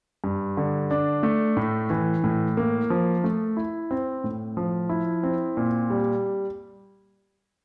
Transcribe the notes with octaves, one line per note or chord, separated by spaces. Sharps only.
G2
D3
D4
A3
A2
E3
A2
A#3
F3
A3
E4
C4
A2
F3
E4
C4
A#2
G3